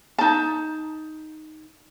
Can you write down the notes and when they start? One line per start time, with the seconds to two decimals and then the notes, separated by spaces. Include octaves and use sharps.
0.18 D#4 A5